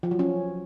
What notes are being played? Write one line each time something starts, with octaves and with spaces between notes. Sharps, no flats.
F3
F#3
C#4